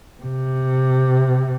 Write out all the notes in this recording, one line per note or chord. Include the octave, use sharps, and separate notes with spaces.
C3